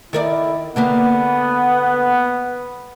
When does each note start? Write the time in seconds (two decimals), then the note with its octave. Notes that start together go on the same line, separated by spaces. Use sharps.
0.13 D#3 E4 A#4 D5
0.76 D3 A#3 B3 G4